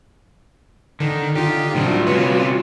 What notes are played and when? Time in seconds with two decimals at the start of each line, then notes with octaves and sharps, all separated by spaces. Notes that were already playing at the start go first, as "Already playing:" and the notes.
1.00 D3 D#3
1.36 D3 D#4 F4 G4
1.75 A2 C3 D#3 G3 D4 F4 F#4
2.07 C3 C#4 B4